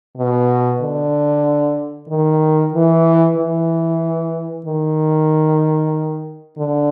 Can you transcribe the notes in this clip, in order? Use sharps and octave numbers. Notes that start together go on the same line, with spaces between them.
B2
D3
D#3
E3
E3
D#3
D3